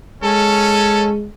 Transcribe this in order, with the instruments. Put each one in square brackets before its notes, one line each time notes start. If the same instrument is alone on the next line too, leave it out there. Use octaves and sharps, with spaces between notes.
[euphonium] G#3 [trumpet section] C#4 A4